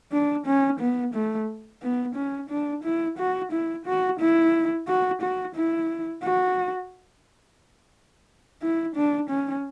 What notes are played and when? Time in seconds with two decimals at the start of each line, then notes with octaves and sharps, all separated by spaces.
0.12 D4
0.46 C#4
0.80 B3
1.14 A3
1.82 B3
2.15 C#4
2.50 D4
2.84 E4
3.18 F#4
3.52 E4
3.86 F#4
4.20 E4
4.88 F#4
5.21 F#4
5.56 E4
6.23 F#4
8.62 E4
8.95 D4
9.29 C#4